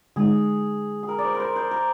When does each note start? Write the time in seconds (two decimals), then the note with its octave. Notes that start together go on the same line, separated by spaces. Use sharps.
0.16 D3 G#3 D#4 G#4
1.03 G#4
1.09 A#4
1.18 D5
1.25 C5
1.34 A#4
1.40 C5
1.56 C5
1.71 A#4